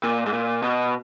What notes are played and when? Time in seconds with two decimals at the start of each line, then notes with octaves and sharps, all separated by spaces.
0.04 A#2
0.26 G#2
0.33 A#2
0.62 B2